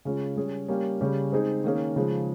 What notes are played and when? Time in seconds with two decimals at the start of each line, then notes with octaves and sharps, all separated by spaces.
0.05 C#3 G#3 C#4 F4
0.37 G3 C#4 G#4
0.68 G3 A#3 C#4 G4
1.01 C#3 G3 C#4 G4
1.32 G#3 C4 D#4 G#4
1.64 D#3 A#3 C#4 G#4
1.96 C#3 F3 G#3